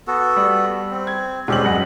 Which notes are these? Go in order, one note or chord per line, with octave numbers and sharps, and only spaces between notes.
B3 F#4 A4
G3
C4
G#6
E1 G3 C4 C#4 G4 F#7
F#2 D#5 F#5